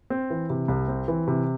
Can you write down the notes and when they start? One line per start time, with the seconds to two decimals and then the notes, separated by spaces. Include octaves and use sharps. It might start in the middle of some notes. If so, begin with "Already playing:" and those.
0.10 C4
0.30 E3
0.50 C3
0.68 C2
0.88 C4
1.08 E3
1.28 C3